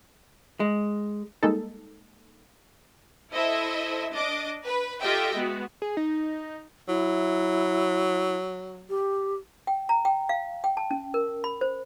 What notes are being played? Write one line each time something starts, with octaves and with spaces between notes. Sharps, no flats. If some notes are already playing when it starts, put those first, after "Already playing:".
G#3
G3 G#3 A#3 D#4 A4
E4 A4 C5 D#5 E5
D4 D#5 D6
B4
F4 G4 A4 D#5 E5 G5
G#3 B3 F#4
G#4
D#4
F#3 E4
G4
G5
A#5
G5
F5
G5
A5
C#4
A#4
B5
C5